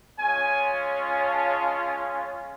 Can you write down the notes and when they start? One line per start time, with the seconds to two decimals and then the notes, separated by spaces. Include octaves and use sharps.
0.18 G#3 C#4 F4 G#5
1.23 A5
1.75 G#5